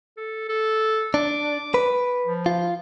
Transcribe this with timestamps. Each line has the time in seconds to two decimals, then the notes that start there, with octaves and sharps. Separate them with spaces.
0.17 A4
0.49 A4
1.14 D4 D6
1.74 B4
2.25 F3
2.46 F4